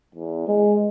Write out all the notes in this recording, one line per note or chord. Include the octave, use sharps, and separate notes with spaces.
E2
G#3